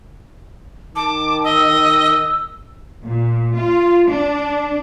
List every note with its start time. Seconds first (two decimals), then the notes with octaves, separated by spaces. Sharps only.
0.95 D#3 A5 D6
1.44 D#5 E6
3.05 A#2
3.57 F4
4.09 D4